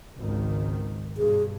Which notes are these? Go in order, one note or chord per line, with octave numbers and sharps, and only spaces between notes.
G#1 C#2 D#3
G2 B2 G#4